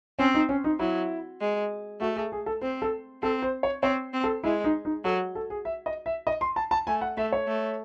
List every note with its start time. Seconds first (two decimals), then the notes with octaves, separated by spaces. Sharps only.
0.19 C4 C#4
0.34 D#4
0.49 C#4
0.64 D#4
0.79 F#3 E4
1.41 G#3
2.01 A3 F#4
2.16 G#4
2.32 G#4
2.46 A4
2.61 C4 C5
2.82 A4
3.22 C4 A4
3.42 C5
3.63 C#5
3.83 C4 C#5
4.13 C4
4.24 A4
4.44 G#3 E4
4.64 D#4
4.85 D#4
5.04 F#3 A4
5.35 A4
5.50 G#4
5.65 E5
5.86 D#5
6.06 E5
6.27 D#5
6.41 C6
6.56 A5
6.71 A5
6.87 A3 G#5
7.01 F#5
7.17 A3 E5
7.32 C#5
7.47 A3